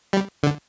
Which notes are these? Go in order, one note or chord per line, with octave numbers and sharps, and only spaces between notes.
G3
D3